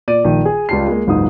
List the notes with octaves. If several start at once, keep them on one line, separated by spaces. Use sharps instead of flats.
A#2 D5 D#7
A#1 D#3 G3
G#4
C#2 G3 F4 G4 A5 C7
G#3 A#3
F#1 C#2 G#2 G#3 D#4 D#6